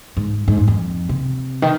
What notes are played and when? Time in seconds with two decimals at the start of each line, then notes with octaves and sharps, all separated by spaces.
0.17 G#2
0.48 G#2
0.58 F#2
0.68 F2
1.09 C3
1.62 D#3